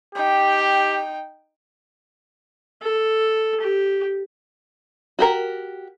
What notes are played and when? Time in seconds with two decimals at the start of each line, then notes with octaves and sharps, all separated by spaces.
0.15 D#4 G4 G5
2.82 A4
3.61 G4
5.19 F#4 G4 A#4